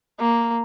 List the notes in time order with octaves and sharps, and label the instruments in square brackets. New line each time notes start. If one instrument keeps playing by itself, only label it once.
[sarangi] A#3